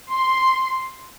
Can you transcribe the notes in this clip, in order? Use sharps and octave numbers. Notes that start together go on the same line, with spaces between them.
C6